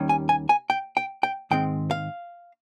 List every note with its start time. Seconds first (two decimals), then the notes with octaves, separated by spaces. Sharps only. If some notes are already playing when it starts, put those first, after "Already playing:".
Already playing: D#2 D#3 G3 C#4
0.09 G#5
0.29 G#5
0.49 G#5
0.70 G5
0.97 G5
1.23 G5
1.51 G#2 D#3 G#3 C4 G5
1.91 F5